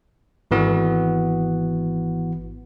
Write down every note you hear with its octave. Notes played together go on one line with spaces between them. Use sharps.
G#1 E3 B3 F#4